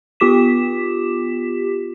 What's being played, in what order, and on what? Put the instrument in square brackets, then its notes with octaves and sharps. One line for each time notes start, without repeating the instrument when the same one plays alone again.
[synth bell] B3 F4 G4 D6 B6 E7